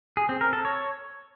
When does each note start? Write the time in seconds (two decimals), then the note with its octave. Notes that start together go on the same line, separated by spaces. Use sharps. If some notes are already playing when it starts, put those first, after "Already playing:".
0.17 G#4
0.29 C4
0.41 A#4
0.53 A4
0.65 C#5